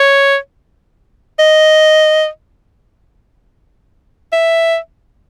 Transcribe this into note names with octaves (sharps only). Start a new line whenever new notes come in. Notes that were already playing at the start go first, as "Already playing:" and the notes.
Already playing: C#5
D#5
E5